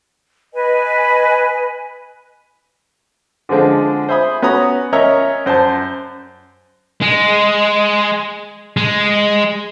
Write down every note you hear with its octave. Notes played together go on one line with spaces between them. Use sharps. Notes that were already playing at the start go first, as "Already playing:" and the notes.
B4 D#5 G#5
D3 F3 G#3 C4 D4
C5 E5 G#5 B5 D#6
B3 C#4 F#4 A#5 D#6
C#4 A#4 C#5 D#5 E5 A#5
F#2 C5 G#5 A5
G#3
G#3